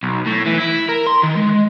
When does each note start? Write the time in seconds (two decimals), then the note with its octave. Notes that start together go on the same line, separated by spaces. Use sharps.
0.03 B1
0.26 A2
0.46 E3
0.59 E4
0.89 A#4
1.07 C6
1.23 D#3
1.37 G#3